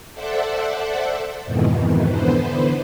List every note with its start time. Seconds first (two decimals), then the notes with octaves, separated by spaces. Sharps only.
0.13 A4 C5 D5 E5 F#5
1.45 F2 G#2 B2 D#3 E3
2.07 D3 E3 B3 B4 C5